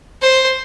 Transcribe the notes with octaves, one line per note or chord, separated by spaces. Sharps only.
C5